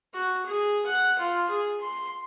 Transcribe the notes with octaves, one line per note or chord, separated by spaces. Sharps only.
F#4
G#4
F#5
F4
G#4
C6